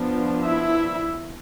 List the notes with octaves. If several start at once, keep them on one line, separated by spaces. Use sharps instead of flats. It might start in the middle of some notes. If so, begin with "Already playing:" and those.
Already playing: F3 B3 D4
E4 E5